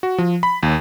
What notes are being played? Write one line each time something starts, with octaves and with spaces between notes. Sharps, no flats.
F#4
F3
B5
D#2